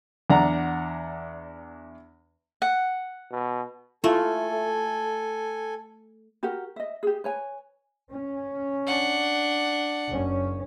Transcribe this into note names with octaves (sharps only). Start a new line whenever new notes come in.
E2 D4 F#5 A#5
F#5
B2
A3 E4 F4 A4 G#5
F#4 G4 A#4 F#5
D#5 E5
G4 G#4
B4 C#5 G#5
C#4
D4 F#5
F#1 F#2 C#4